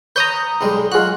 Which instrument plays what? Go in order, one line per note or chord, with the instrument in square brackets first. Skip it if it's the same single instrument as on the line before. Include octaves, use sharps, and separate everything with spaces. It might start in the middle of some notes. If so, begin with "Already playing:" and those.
[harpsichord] B4 C#5 B5 [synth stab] A#5 D#6 G6
[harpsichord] B1 G3 G#3
[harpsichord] F#3 F4 F#4 [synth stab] G#3 F#6